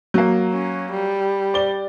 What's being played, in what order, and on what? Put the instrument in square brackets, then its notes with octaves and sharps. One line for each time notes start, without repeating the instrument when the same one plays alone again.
[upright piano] F#3 A#3
[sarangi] C#4
G3
[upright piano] D5 G7